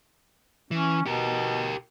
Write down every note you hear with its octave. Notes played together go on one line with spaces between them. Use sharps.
E3 C#4
B2 G4 A#4